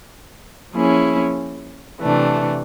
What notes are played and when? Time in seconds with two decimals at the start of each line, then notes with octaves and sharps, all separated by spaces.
0.74 F3 A#3 C#4 E4 G#4
2.01 C3 E3 A3 D4